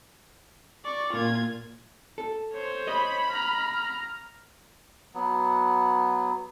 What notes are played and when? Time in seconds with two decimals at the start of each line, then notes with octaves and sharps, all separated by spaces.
0.84 D5 C#6
1.13 A#2 F4 G#6
2.18 A4
2.53 C5 C#5
2.87 D#5 B5
3.30 A#5 F6
5.14 F#3 B3